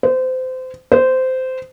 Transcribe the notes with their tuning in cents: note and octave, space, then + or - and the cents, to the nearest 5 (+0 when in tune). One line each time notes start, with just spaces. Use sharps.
C5 -25
C5 -15